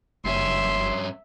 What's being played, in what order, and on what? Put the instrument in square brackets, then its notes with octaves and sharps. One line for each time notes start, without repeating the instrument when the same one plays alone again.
[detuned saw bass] F#1 [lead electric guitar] G2 C#4 [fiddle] E5 [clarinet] C6